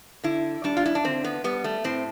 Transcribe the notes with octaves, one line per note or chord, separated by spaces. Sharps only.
D3 E4
G3 D4
F4
E4
D4
D3 C4
B3
G3 B3
A3
A2 C4